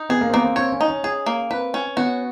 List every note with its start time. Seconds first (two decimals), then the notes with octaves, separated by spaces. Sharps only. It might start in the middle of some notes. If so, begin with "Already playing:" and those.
Already playing: D#4
0.09 B3 G#4
0.21 A#3
0.30 C4
0.33 A#3 B3
0.44 C4
0.56 C4 C#5
0.72 C#4
0.81 D#4
0.88 C#4
1.04 C#4 G#4
1.26 A#3
1.50 C4 B4
1.74 C#4
1.97 B3 F#4